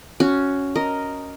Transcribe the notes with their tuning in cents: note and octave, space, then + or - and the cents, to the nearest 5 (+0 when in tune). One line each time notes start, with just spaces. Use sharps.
C#4 +5 F#4 +0
A#4 +0 D#5 +0